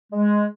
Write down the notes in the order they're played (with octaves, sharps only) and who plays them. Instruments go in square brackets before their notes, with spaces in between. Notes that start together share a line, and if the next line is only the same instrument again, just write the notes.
[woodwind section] G#3